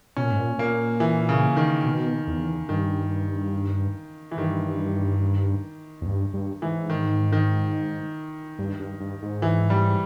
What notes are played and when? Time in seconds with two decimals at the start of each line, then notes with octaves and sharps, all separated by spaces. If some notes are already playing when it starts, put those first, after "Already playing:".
0.17 B2 C#4
0.23 A#2
0.31 G#2
0.39 A#2
0.58 A#2 A#3
1.00 E3
1.29 C#3
1.57 D#3
1.84 B2
2.27 E2
2.69 G2 D#3
4.31 E3
4.37 G2 D#3
6.01 E2
6.06 G2
6.33 G2
6.62 G#2 E3
6.90 D#3
7.32 D#3
8.59 G2
8.80 G2
9.00 G2
9.22 G#2
9.42 E3
9.70 G3